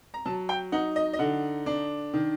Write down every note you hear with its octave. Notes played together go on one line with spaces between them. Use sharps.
A#5
F#3 A5
G5
D#4 F#5
D#5
D#5
D3 F#5
D4
D#3